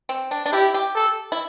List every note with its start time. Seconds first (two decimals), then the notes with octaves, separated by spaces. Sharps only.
0.09 C4
0.31 D4
0.46 D4
0.52 E4 G4
0.74 G4
0.95 A4
1.32 E4